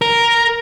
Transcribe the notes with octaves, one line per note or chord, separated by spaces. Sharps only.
A#4